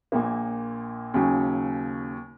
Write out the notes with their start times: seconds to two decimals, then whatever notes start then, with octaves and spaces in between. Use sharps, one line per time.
0.12 A#1 A#2 A#3
1.14 D#2 C#3 F#3 C#4